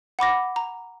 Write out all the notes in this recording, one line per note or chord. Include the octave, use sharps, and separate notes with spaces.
F#5 B5 D6 A#6
A#5